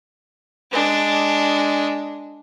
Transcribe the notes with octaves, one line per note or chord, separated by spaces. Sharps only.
G#3 D4